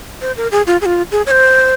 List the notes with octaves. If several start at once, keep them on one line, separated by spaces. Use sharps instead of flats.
C5
A#4
G#4
F4
G#4
F4
G#4
C#5
C5